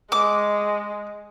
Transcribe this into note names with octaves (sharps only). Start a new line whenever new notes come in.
G#3 D6